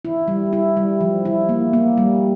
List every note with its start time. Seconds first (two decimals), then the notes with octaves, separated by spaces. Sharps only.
0.05 E4
0.28 G3
0.53 E4
0.77 G3
1.01 F3
1.25 E4
1.49 A#3
1.73 A#3
1.97 G3